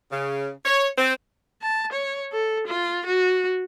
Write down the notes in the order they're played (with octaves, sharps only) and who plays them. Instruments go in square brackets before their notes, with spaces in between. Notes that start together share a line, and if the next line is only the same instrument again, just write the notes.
[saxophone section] C#3
C#5
C4
[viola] A5
C#5
A4
F4
F#4